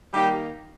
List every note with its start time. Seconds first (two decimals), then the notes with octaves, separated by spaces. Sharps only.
0.13 D#3 G3 A#3 D#4 G4